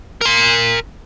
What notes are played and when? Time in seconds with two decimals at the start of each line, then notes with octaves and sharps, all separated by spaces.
0.21 A#4 C6